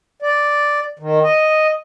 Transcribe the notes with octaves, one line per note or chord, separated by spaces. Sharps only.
D5
D#3
D#5